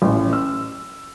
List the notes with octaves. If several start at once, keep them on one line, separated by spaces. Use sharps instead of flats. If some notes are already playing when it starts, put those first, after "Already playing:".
A1
E6